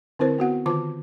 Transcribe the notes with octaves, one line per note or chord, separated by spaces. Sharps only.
D3 C4 E4 A#4 C5
B3 F#4 F#5
D3 D#3 F4 A5 D6